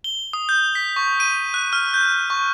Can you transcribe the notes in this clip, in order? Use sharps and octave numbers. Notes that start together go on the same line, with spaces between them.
G7
D#6
G6
B6
C#6
D#7
F#6
F6
G6
C#6